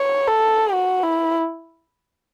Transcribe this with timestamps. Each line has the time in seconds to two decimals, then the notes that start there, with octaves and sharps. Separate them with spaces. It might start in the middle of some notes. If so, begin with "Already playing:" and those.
Already playing: C#5
0.28 A4
0.73 F#4
1.04 E4